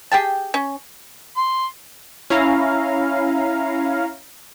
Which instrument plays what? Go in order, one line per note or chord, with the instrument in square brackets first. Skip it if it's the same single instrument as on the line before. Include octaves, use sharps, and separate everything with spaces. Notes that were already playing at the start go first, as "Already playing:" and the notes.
[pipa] G4 G#4 G5 A5
C#4
[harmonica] C6
[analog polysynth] C#4 E4 F5 A#5